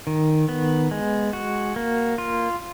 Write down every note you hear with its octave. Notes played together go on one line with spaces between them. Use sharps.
D#3
B3
G#3
F#4
A#3
F4